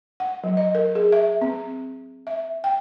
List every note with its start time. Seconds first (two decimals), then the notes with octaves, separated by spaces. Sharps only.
0.20 F#5
0.44 F#3
0.57 D#5
0.75 A#4
0.95 G#4
1.12 E5
1.42 C4
2.27 E5
2.64 G5